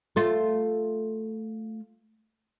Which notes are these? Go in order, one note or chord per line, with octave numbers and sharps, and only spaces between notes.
A3 F4